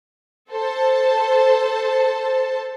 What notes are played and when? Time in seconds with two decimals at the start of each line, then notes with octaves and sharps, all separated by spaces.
0.50 A4 C5 A5